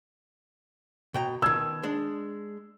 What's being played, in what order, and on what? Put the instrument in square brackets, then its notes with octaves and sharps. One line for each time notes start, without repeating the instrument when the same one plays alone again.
[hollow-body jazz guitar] B2 G5 A#5
[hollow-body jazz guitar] B2 D#3 [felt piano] E6 G#6
[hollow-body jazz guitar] G#3 D4